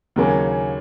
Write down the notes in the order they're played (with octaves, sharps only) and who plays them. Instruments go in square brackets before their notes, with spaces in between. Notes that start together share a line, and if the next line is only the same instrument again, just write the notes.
[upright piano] D#2 C#3 F#3 A#3 C#4